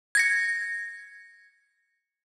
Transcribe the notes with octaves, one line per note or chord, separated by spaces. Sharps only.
G#6 A#6 C#7